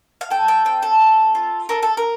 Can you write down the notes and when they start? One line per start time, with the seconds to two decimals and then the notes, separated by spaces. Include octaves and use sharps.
0.21 F5
0.30 A4 G5
0.48 G5
0.65 C4 G5
0.83 A4
1.01 C4
1.35 F4
1.69 A4 A#4
1.83 A4
1.97 A#4